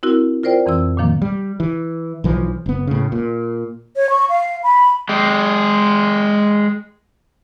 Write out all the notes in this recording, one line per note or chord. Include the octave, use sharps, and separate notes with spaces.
C4 E4 F#4 A#4
F4 A#4 C5 D5 G5
F2 E3 C4 E6
A#2 D3 D#3 F3 A#3
G3
E3
B1 E3 F3
F#1 B3
A2 C#3
A#2
C#5
C#6
F5
B5
G#3 G4